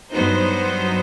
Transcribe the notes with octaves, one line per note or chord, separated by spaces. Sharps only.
G2 F#3 B3 D#4 C5